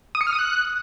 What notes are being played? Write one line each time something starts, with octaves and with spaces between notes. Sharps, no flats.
D#6
C#7
F6
D#6
F#6